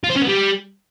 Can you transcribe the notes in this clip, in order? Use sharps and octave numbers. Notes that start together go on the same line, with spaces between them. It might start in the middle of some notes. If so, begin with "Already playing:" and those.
F4
C5
C#4
B3
G3